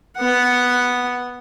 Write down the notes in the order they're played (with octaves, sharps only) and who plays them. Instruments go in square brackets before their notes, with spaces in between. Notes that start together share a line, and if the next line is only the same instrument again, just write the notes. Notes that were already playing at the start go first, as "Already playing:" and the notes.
[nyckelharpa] B3 F#5